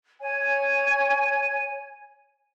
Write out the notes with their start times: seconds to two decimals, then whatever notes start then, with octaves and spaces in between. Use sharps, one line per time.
0.21 C#5 G#5